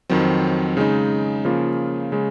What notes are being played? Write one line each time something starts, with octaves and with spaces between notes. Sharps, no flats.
F2 D#3 F#3 C4
C#3 G#3 D#4
C#3 F3 A#3 F4
C#3 G#3